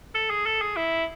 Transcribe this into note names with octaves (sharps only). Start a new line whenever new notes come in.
A4
G#4
A4
G#4
E4